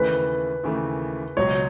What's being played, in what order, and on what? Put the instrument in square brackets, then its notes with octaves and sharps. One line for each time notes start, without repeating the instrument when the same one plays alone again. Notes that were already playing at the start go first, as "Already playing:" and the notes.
Already playing: [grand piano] D#2 C#3 E3 A3 [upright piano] B4
[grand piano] D#2 C#3 E3 A3
[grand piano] C#2 B2 F#3 [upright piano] C#5